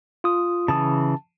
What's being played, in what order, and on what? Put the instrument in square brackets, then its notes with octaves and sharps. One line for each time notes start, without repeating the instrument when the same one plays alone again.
[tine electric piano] F4 D#6
[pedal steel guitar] C#3 E3 D#6 [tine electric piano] A5